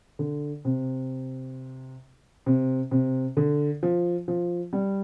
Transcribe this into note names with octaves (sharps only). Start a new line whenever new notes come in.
D3
C3
C3
C3
D3
F3
F3
G3